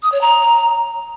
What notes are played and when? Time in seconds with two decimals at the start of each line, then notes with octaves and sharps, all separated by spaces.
0.03 D#6
0.12 C#5
0.21 A#5